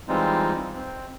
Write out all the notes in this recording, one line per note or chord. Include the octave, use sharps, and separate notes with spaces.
E3 G3 G#3 C4 D#4 F4
C4